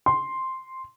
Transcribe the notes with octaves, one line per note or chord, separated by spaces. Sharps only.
C6